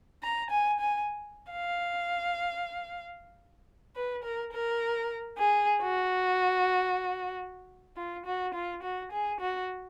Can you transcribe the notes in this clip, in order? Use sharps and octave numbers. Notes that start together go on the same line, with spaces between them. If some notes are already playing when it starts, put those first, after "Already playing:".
A#5
G#5
G#5
F5
B4
A#4
A#4
G#4
F#4
F4
F#4
F4
F#4
G#4
F#4